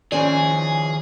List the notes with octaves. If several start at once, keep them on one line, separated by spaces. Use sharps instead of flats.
D#3 F3 C#4 G#4 C5 D5 G#5